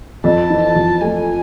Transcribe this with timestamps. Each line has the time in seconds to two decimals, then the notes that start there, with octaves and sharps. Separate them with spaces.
0.24 F2 A5
0.50 E3
0.63 A5
0.75 F2
1.01 A3 G#5